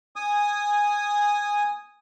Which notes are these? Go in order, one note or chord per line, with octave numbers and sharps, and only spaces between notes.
G#5 D#6